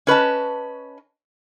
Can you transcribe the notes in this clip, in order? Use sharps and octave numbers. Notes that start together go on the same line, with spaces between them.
C#4 B4 D#5 A5